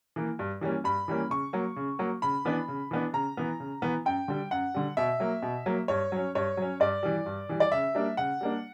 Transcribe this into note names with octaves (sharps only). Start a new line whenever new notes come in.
E3 A#3
G2
E3 G3 A#3 C#4
G2 B5
E3 G3 A#3 C#4
C#3 C#6
F#3 A#3
C#3
F#3 A#3
C#3 B5
E3 B3 D4
C#3
E3 B3 D4
C#3 A#5
E3 B3
C#3
E3 B3
F#2 G5
D3 G3
F#2 F#5
D3 G3
B2 E5
F#3 A#3
B2
F#3 A#3
G2 C#5
F#3 C#4
G2 C#5
F#3 C#4
G2 D5
E3 G3
G2
E3 G3
D5
C#3 E5
G3 A#3 D4
C#3 F#5
G3 A#3 D4